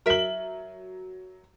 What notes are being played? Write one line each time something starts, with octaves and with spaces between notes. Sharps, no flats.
F#3 A#4 E5 F#7